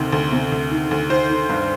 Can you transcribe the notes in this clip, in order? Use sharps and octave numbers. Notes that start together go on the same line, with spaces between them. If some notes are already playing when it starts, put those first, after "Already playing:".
Already playing: D2 C3 D#3
D2
C3
D2
D#3
D2
D#3 C5
D#3
G2